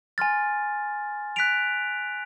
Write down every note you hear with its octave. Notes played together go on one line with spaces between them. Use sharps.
G#5 C6 F6 A6
F#6 B6 D7 F7